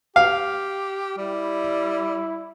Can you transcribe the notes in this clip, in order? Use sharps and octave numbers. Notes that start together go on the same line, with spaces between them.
G4 F5
G3 E4